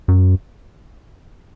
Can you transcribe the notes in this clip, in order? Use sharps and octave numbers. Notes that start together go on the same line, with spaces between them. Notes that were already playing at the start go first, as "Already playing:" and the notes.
F#2